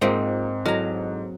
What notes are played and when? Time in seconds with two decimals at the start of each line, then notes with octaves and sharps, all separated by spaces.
0.01 G#2 A#3 C4 D#4 F4 A#4 C5
0.66 F#3 E4 A4 D#5 A#5